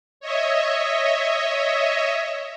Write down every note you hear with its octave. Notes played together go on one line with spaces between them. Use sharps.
C#5 D#5 E5